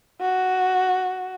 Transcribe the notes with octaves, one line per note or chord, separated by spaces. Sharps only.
F#4